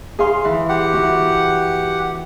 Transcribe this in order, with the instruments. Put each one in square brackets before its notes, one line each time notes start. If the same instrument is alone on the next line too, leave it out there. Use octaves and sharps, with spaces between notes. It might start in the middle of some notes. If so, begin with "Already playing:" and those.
[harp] G#4 F5 C6
E3
[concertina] G4 F#5
[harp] E3 F#4